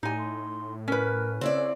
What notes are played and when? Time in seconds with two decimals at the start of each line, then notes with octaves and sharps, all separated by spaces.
0.03 A2 D#4 G4 G#5
0.18 C6
0.88 C#4 A#4 B4
1.41 C#3 C4 E4 C#5 D5